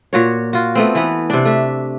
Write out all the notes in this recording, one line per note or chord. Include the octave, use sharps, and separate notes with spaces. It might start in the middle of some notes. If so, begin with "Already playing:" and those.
A#2 F#4 C#5
F4 F#4
A3 B3 C4
E3 B3
C3 D4
A3 E5